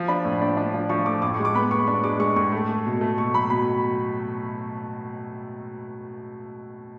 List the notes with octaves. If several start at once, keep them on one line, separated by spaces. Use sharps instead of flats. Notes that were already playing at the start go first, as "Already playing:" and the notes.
Already playing: F3
D4 B5
A2
D4
D4
F3
F3 C#6
A3 D6
A2 D6
C#6
G#3
D6
B3 B5
B3 C#6
D4 C#6
G#3 D6
G#3 C#6
A2 C#6
A3
A3
B2
A3
B2 C#6
F#3 B5
B2 B5